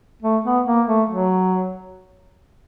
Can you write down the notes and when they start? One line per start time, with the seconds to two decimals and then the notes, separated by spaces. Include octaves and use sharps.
0.22 A3
0.45 B3
0.67 A#3
0.87 A3
1.09 F#3